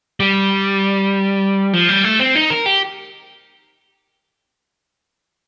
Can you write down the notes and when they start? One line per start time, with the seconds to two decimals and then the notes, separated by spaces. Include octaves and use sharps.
0.20 G3
1.73 F3
1.89 G3
2.04 A3
2.20 C4
2.35 D#4
2.50 A#4
2.66 G4